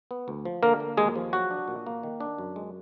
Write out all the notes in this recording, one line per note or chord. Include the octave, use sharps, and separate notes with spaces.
B3
D2
F3
D3 A#3 A#4
A#3
D#2 G#3 G#4
F3
F#3 F#4
D4
A#2
A#3
D#3
D4
F#2
G#3